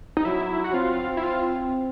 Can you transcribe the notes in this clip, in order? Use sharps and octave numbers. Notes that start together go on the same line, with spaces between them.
D#4
F#3 E4
F#4
C4 F4
E4
F4